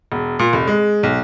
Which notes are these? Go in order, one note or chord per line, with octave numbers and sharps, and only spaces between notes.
E1
A#2
F1
G#3
B1